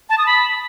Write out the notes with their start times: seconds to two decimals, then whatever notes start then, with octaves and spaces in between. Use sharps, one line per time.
0.10 A5
0.18 D#6
0.26 B5